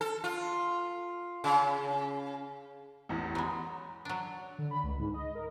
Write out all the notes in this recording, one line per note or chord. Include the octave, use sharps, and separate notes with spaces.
A4
F4
C#3
A1 E2
F#3 G#3 A#5 B5
F#3 D4
D3
B5
C#2
G#2
D#5
A#4